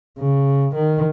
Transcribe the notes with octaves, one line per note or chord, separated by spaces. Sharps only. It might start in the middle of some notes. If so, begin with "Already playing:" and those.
C#3
D#3